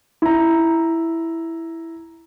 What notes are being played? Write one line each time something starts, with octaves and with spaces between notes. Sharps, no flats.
E4 A#5